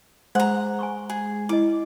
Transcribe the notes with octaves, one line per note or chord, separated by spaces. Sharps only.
G#3 C5 F#5 A#5 C6 D6
G#5 C6 C#6
G#4
E4 D#5 D6